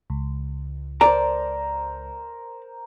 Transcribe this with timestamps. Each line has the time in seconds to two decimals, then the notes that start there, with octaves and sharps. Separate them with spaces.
0.10 C#2
1.01 A#4 C5 D5 A#5